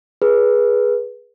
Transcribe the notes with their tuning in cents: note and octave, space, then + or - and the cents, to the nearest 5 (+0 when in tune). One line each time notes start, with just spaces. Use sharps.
G#4 +0 B4 -20